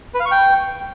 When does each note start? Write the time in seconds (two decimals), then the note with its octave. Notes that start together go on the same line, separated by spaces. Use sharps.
0.14 B4
0.20 F5
0.26 C#6
0.31 G5